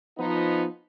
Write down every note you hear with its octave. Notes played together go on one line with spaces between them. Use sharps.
F3 B3 D#4